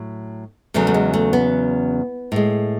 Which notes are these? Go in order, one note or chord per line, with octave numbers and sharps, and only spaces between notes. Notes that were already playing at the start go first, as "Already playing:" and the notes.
Already playing: A2 F#3
E2 C#3 F#3 A3
A3
G#3
A3
B3
A2 G#3